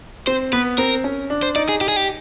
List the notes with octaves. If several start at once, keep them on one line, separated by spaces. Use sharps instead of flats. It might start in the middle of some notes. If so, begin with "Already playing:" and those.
C4 C5
B3 B4
C4 A#4
C#4
D4
C5
D#4 D5
G#4
G4
G#4
G4